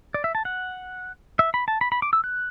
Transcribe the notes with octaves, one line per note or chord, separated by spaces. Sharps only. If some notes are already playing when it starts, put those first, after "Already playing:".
D5
E5
A5
F#5
E5
B5
A5
B5
B5
D6
E6
F#6